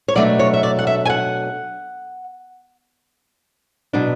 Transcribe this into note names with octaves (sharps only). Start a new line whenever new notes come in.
C#5
B2 F#3 A3 D4 D5
C#5
E5
D5
F#5
E5
G#5
F#5
B2 F#3 B3 D4